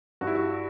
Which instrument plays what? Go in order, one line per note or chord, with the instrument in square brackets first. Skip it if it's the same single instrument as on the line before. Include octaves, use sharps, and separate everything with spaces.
[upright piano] G2 F#4
E4
F#4